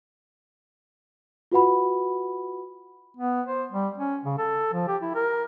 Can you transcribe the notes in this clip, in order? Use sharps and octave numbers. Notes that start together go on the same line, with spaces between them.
F4 F#4 B4 F#5 B5
B3
C5
G3
C#4
C#3
A4
F3
G4
E4
A#4